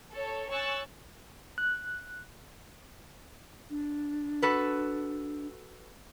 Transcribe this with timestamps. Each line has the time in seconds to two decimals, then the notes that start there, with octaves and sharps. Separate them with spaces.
0.13 A4 C#5
0.52 C#5 G#5 C#6 E6 F#6 A6
1.58 F#6
3.70 D4
4.42 F#4 A4 B4